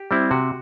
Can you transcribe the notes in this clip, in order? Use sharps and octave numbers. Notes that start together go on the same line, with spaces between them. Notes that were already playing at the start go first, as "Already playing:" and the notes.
Already playing: G4
G3 C4 E4
C3 F#4